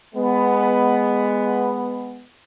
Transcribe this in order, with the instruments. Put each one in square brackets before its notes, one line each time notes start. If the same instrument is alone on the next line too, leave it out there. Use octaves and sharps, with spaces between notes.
[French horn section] G#3 B3